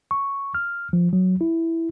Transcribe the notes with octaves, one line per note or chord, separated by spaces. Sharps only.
C#6
F6
F3
F#3
E4